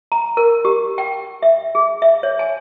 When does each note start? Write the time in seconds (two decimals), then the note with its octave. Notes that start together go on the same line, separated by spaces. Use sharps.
0.12 A#5
0.37 A#4
0.65 G4
0.98 G5
1.42 E5
1.75 G#4
2.02 E5
2.23 C#5
2.39 G#5